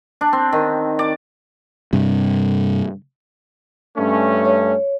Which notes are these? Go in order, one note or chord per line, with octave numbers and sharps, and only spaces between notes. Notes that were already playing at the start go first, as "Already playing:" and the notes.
D4
C4
D#3
D5
G2 C3
G2 A3 C#4
C#5